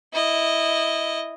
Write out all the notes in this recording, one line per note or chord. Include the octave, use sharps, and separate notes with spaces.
E4 D#5